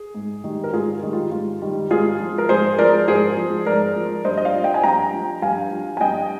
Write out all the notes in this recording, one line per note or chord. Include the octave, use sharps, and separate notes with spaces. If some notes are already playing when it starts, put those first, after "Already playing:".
Already playing: G#4
G#2
D#3 G3
A#4
G#2 F4 G#4
D#3 G3
F4
G#2 F4
D#3 G3
G#2 F4 G#4
F3
A#4
G#2 G#4 C5
F3 A#4 D5
G#2 G#4 C5
F3
G#2 A#4 D5
F3
G2 C5 D#5
D#5
D5 F5
F3
D#5 G5
G#5
G2 G5 A#5
F3
G2 F5 G#5
F3
G#5
G2 D#5 G5